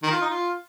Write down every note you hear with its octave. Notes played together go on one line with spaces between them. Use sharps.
D#3
F4
D#4
F4